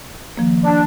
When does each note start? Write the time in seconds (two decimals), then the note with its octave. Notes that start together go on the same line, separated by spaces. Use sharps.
0.37 D#3 F3 A#3
0.64 D4